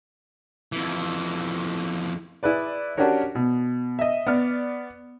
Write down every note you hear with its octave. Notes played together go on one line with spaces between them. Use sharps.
F2 E3
E4 G#4 B4 D5
C#4 D4 F#4 G4 A#4 C#5
B2
D#5 E5
B3 D5 F6